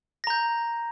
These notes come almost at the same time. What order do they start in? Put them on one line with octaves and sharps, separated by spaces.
A#6 A#5 G6